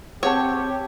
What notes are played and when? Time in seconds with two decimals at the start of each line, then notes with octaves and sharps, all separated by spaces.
0.23 C4 G4 G#4 C#5 F#5 A5